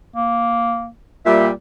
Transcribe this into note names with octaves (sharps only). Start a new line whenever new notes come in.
A#3
A#2 G3 E5